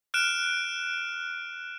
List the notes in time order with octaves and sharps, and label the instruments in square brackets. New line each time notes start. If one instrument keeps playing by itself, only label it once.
[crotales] F6 F#6 D7 E7